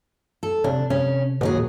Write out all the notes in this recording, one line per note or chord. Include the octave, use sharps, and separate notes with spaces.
A4
C3 D4
C3 C#4
D#2 A#2 F#3 G#4